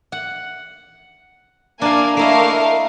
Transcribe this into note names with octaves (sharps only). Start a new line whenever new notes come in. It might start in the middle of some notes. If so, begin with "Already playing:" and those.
F#5
A#3 D4 E4 F5 G#5
A3 A#3 E4 A#4 D#5 F5